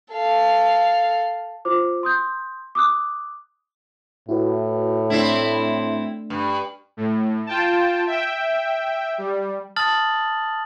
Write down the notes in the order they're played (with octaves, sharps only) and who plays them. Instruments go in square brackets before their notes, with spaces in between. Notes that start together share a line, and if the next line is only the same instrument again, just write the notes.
[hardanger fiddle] A4 F5
[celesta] F4 C5 D6
C6 D#6 G6
D6 D#6 F#6
[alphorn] A2 [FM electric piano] E4 F#4 B4
[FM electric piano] A3 D4 [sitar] C4 E4
[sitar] G2
[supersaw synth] A2
F4 G5 A5
E5 G5
G3
[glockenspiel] A5 D#6 F6 A6 F#7